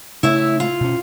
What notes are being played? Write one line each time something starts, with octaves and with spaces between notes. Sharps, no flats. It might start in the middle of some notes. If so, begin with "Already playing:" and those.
C#3 A3 E4 C#5 E5
F4
B2 C#4